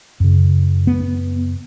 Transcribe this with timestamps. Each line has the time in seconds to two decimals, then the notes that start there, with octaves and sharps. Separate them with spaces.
0.20 F#2 C#3
0.87 B3